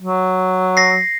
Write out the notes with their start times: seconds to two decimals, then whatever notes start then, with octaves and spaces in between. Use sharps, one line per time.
0.01 F#3
0.77 A#6 C7